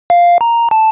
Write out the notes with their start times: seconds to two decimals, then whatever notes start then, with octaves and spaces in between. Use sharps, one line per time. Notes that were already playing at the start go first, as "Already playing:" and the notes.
0.10 F5
0.41 A#5
0.71 A5